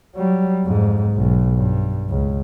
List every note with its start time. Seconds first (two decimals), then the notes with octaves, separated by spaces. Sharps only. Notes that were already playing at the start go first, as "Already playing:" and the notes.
0.16 F#3 G3
0.64 F2 G#2
1.13 B1
1.55 G2
2.10 C#2